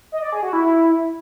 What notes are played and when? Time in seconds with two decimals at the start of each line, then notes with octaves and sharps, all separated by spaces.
0.12 D#5
0.22 D5
0.32 G#4
0.43 F#4
0.53 E4